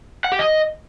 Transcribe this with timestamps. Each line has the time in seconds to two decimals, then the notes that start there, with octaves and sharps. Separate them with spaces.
0.24 F#5
0.32 G4
0.39 D#5